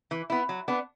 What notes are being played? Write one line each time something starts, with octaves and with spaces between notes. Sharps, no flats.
E3
B3 E4
F#3
B3 D4